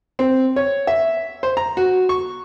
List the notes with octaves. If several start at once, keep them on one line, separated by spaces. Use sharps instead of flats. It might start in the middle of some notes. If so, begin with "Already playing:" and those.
C4
C#5
E5
C5
A#5
F#4
C#6